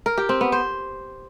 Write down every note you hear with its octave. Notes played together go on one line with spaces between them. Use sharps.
A#4
G4
C4
B3
C5